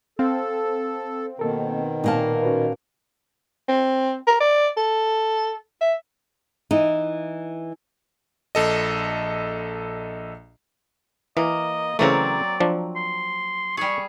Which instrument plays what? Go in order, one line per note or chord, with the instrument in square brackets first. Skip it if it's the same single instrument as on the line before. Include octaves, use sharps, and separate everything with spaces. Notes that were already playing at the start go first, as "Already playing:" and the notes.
[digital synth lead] C4 [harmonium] A4 [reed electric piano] F5
[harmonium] B2 D#3 [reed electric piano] A#3 A4 A#4
[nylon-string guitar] A#2 A#3 A5 [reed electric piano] D#4 F5
[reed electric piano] C#4 F#4 B4
[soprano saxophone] C4
A#4
D5
A4
E5
[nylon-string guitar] E3 D#4
[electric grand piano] A#1 A4 D#5
[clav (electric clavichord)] E3 [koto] A#3 [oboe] D#5
[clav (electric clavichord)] C#3 E3 A3 [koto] F#3 C4 A#4 [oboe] D5
[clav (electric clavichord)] F3 D4
[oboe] C6
[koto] G3 G#4 [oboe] C#6